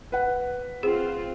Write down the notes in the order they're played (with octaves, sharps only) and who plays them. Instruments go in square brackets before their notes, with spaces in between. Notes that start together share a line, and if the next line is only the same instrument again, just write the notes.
[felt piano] B4 F#5
[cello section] C4 F4 [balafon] G#4 C5